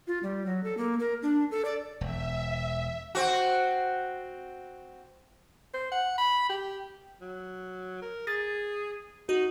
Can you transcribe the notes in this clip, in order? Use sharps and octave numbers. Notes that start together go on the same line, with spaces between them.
F4
G3
F#3
A4
A#3
A#4
D4
A4
D5
E1 E5
C4 F#4
C5
F#5
B5
G4
F#3
A#4
G#4 A6
D#4 F#4